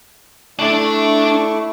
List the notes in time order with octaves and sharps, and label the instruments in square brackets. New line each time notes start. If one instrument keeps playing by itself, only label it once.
[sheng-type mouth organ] A3 E4 C#6 [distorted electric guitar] D4 D5